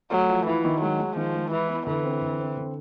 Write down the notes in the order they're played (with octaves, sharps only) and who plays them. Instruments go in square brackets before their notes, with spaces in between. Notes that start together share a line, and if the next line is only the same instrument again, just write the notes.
[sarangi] F#3 [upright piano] A3
[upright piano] F3
[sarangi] E3 [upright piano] E4
[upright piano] D#3
[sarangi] F#3 [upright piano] G#3
[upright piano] G#3
[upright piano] D#3 [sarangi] F3
[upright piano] G#3
[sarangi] E3 [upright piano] E4
[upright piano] B3
[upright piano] D3 [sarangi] E3
[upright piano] C4
D3
C4
D3